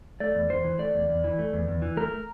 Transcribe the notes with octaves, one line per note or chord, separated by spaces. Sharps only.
A3 D5
E2
E2 C5
E3
A3 D5
E2
E2
E3
A3
E2
E2
E3
A3 A#4